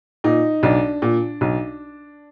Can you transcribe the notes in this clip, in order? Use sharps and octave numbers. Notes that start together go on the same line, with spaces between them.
A#2 D#4
B1 D4
A#2
B1